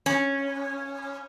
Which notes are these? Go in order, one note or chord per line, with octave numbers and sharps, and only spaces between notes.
C#4